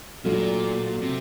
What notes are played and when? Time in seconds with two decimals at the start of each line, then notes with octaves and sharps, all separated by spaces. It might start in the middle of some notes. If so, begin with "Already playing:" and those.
0.25 A#2 F#3 A3 D4 F4
1.02 C3